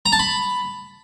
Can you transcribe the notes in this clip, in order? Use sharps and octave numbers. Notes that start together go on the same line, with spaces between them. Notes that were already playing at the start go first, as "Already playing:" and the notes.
A#5
A5
B5